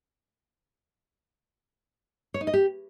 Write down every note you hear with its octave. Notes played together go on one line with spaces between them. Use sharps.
C#5
D#4
D#5
G4